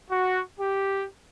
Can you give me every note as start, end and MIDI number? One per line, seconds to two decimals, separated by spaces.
0.11 0.41 66
0.60 1.05 67